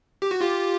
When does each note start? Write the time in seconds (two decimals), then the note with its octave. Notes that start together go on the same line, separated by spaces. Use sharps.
0.22 G4
0.31 F#4
0.40 F4 G4